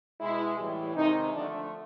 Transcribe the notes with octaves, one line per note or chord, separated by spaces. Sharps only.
B2 G#3 E4
A2 E3 G3
C3 D#3 G#3 D#4
D3 F3 A3 D4